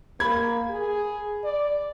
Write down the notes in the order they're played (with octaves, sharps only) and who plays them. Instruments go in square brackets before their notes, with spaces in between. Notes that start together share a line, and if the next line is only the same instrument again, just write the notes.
[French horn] A#3 [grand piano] B5 G#6
[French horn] G#4
D5